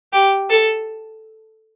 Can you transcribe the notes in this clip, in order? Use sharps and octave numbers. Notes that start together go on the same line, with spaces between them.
G4
A4